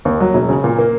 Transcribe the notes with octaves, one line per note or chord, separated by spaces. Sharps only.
D#2
F#3
E1
C#3
A#2
A#3